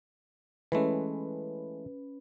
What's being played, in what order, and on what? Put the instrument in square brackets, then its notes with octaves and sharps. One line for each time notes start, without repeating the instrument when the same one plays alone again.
[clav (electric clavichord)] E3 G#3 A3 [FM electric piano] C#4 B4